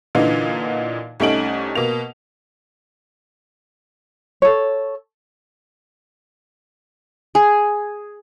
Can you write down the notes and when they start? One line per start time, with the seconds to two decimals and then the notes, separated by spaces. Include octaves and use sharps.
0.15 A#2 D3 E3 D#4 F4
1.20 C2 A3 C#4 D#4 D7 F#7
1.75 B2 A#3 F7
4.42 A4 C#5
7.35 G#4